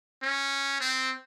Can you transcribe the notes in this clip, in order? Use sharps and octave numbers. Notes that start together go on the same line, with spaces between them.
C#4
C4